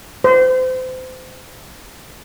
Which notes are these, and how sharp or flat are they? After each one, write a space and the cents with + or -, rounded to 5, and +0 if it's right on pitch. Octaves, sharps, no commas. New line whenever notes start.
C5 -30